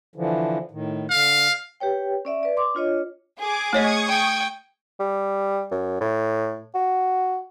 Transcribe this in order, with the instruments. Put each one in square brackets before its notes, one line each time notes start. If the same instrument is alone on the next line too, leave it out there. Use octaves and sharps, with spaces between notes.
[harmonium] D3 E3 F3
A2 D#3
[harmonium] D3 [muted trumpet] F5
[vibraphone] G4 B4 C#5 G5
C#4 D5 E5
B4 D5
C6 D6
D4 F4 C#5 D#5
[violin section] G#4 [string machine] D6
[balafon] A3 C#5 D#5 [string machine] C#6 D#6 G#6
[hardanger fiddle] G5
[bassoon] G3
F#2
A2
F#4